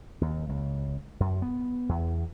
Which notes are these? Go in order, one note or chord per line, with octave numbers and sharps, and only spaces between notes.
D#2
C#2
F#2
B3
E2